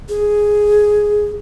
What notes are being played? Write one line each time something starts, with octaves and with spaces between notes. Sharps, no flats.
G#4